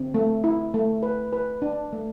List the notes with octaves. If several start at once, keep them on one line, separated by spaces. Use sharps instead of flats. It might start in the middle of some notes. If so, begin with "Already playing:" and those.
Already playing: D3 C4
A3
E4
A3
B4
B4
D4
A3